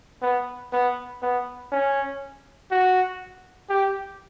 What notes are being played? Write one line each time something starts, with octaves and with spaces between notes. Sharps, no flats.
B3
B3
B3
C#4
F#4
G4